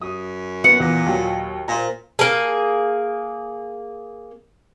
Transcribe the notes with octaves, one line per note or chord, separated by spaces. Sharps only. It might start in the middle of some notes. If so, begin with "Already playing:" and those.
F#2 D#6
B3 F#5
E2 A#2
D#2 F#3
A#2 A#4 C5
A#3 G#4